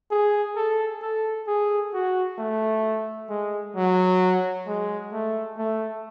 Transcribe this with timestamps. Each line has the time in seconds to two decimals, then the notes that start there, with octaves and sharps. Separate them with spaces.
0.11 G#4
0.56 A4
1.02 A4
1.47 G#4
1.93 F#4
2.38 A3
3.30 G#3
3.76 F#3
4.66 G#3
5.13 A3
5.57 A3